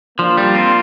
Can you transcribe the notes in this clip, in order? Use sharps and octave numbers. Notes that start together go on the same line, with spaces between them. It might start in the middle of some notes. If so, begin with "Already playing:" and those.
F3 A#3 D4 F4
G3
C4